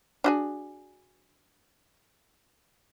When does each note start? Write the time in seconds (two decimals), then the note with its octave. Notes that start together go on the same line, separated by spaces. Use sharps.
0.24 D4 F#4 G#4